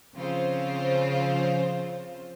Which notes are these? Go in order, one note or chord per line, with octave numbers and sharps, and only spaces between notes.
C#3 F3 C4 F4 C5